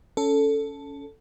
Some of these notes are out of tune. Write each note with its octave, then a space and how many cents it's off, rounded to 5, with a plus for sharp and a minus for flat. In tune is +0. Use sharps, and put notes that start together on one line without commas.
C#4 +15 A4 +0